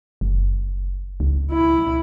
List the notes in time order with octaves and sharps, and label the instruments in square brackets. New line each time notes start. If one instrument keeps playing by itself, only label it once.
[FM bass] F#1
C#2
[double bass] E4